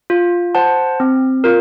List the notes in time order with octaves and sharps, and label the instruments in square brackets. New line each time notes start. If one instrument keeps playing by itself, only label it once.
[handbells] F4
C5 F#5 A5
C4
F4 A#4